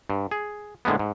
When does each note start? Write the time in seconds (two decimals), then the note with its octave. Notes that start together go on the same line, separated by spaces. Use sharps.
0.10 G2
0.31 G#4
0.85 A2 D3 G#3 A#3 B3
0.99 G#2